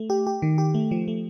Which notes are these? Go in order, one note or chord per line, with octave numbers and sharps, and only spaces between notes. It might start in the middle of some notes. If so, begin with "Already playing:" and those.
Already playing: A3
G4
G4
D#3
G4
A3
F3
A3